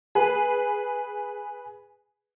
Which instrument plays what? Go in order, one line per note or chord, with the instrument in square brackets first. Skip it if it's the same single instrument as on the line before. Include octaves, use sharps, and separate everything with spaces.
[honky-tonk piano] G#4 B4